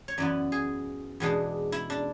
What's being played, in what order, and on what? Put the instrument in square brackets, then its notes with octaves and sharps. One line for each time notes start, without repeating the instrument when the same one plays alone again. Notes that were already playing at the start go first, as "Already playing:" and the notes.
[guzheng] C#5
F#2 E3 B3 D5
G#4
E2 B2 G#3 D4
E4
D4